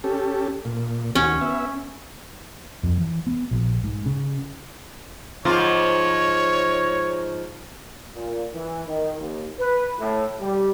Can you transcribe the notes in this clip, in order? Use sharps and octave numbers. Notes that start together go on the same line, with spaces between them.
C#4 G4 A4
A#2
D#2 C#4 F#4
B3 E5
F2
E3
B3
A#1
G#2
C#3
G#2 F3 F4 C#5
A#2
E3
D#3
D#2
B4
A2
G3